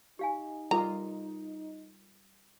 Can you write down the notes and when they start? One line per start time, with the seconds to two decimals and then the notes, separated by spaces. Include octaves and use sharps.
0.19 D#4 G4 F5 G#5
0.71 G3 F4 A4 A#4 D#5 A#5 D6